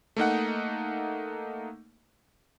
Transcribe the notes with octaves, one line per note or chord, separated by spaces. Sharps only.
A3 A#3 D#4 F#5